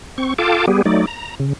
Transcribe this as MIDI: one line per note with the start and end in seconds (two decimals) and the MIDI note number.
0.18 0.34 60
0.18 0.34 85
0.38 0.66 65
0.38 0.66 69
0.38 0.66 77
0.38 0.66 79
0.38 0.66 81
0.38 0.66 86
0.68 0.82 55
0.68 0.82 59
0.68 0.82 67
0.68 0.82 68
0.85 1.06 54
0.85 1.06 57
0.85 1.06 63
0.85 1.06 74
1.07 1.35 82
1.40 1.53 49